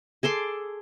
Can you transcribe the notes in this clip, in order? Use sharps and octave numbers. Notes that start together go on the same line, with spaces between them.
G#4 A4 C6 D6